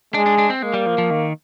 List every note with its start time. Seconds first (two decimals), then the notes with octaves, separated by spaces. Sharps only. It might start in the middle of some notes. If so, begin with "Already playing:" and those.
0.14 G#3 D4
0.26 D4
0.38 D4
0.50 C4
0.62 G#3 A#3
0.74 G3
0.86 F3
0.98 F3
1.11 D#3